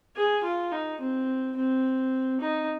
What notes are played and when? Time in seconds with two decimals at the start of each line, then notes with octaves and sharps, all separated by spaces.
0.16 G#4
0.44 F4
0.72 D#4
1.01 C4
1.57 C4
2.41 D#4